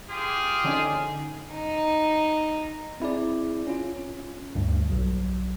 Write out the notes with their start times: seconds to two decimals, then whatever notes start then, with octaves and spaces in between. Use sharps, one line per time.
0.10 F4 G4 G#4
0.64 D3 C#4 D#4
1.53 D#4
3.00 C4 E4 G#4 D5
3.67 C#4 F4
4.55 D2 G2
4.90 B1 F#3